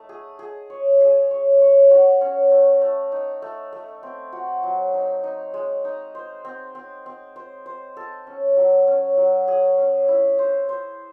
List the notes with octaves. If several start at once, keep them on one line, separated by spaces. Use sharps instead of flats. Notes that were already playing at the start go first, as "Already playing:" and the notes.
Already playing: A3 D#4
G#4
G#4
C#5
G#4
C#5
C#5
F#4
C#4
A3
A3
D#4
A3
A3
C4
F#4
F#3
D#4
D#4
G#3
D#4
C5
C4
C4
C4
C5
C5
A4
C#4
F#3
C#4
F#3
G#4
C#4
E4
C5
C5